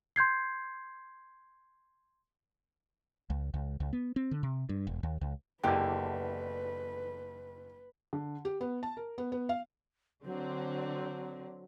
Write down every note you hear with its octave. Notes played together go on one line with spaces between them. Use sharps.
C6 G6 G#6 C7
C#2
C#2
C#2
B3
C4
D3
C3
G2
E1
D#2
C#2
F#1 E2 D3 G4 B4
D3
G4
B3
A5
A#4
B3
B3
F5
D3 F#3 C4